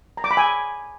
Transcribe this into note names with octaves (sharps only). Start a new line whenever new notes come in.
A#5
D6
B5
G#5